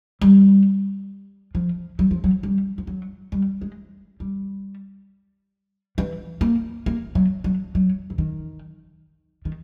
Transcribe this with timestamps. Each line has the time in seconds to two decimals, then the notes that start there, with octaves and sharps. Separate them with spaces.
0.21 G3
1.55 F3
1.99 F#3
2.11 F3
2.24 F#3
2.43 G3
2.78 F3
2.87 F#3
3.32 G3
3.62 G#3
4.20 G3
5.98 E3
6.41 A#3
6.86 A#3
7.15 F#3
7.44 F#3
7.75 F#3
8.10 E3
8.18 D#3
9.45 D#3